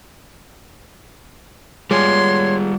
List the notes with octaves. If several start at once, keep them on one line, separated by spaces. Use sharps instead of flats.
G3 G#3 F4 C#5 C6